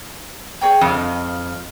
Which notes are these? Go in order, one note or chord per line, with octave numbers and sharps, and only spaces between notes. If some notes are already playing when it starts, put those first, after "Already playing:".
G#4 C#5 G5
F2 D#5 F5